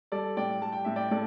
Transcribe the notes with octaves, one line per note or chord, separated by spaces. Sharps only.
G3 A4 D5
A2 D5 G5
G3 A5
G5
A2 E5
D5 G5
A2 A4 D5